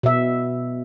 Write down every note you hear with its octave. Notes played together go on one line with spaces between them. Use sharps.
B2 E5